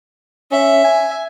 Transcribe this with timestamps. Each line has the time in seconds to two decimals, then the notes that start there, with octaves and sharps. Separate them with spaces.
0.52 C#4 E5
0.85 G#5